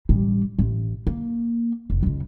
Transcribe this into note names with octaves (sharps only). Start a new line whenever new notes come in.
A1 G3
A1
A#3
F1
C#2 C#3